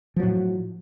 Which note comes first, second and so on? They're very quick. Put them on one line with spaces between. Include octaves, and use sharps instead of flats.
F3 F#3 A2